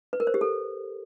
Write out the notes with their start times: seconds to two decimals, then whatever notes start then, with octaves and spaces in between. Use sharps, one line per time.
0.13 B4
0.20 A#4
0.27 C5
0.34 G4
0.41 A4